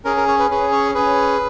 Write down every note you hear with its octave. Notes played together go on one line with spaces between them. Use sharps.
C#4 G#4 A#4
A#4
C#5
B4
C#4 G#4 B4
C#5
C#4 G#4 B4